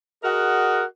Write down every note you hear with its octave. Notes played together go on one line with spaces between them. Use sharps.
F#4 G#4 A#4 D#5 F#5